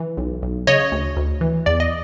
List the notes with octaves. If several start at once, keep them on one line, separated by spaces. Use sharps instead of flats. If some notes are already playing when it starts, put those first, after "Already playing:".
Already playing: E3
B1
B1
C#3 C#5 D#5
D2
D2
E3
E2 D5
D#5